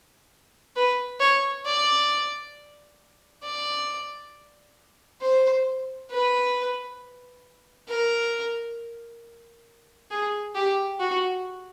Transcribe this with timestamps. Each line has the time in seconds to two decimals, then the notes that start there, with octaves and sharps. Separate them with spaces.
0.76 B4
1.20 C#5
1.66 D5
3.43 D5
5.21 C5
6.11 B4
7.88 A#4
10.11 G#4
10.55 G4
11.00 F#4